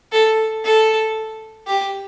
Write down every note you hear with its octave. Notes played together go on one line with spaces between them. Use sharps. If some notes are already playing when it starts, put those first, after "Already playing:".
A4
A4
G4